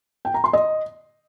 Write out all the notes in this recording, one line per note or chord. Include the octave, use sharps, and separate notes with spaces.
G5
A#5
C6
D#5